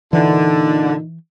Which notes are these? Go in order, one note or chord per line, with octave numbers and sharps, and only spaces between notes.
A#2 D3 E3 D#4